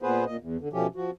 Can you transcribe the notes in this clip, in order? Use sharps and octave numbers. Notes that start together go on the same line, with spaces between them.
A#2 B3 G#4 B4 C5
A#2 D#5
E2
D3
B2 F3 A3 C#4 G4
F3 F#4